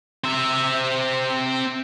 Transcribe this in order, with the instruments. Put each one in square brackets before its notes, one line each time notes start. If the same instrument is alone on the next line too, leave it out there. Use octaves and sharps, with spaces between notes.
[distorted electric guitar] C4 E5